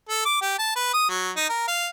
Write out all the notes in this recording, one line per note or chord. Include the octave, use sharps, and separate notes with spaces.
A4
D6
G4
A5
B4
D#6
F#3
D#4
A#4
F5